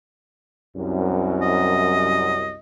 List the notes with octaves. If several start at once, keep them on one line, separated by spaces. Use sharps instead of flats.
C2 F#2
D#5